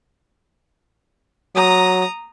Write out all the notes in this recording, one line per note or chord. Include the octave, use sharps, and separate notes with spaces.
F#3 A#5 D#6